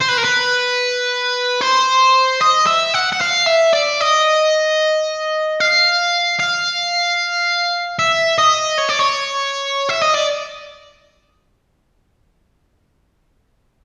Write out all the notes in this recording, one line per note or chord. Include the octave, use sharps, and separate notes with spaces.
C5
B4
A#4
B4
C5
D#5
E5
F#5
F#5
F5
E5
D5
D#5
F5
F5
E5
D#5
C#5
D5
C#5
E5
D#5
D5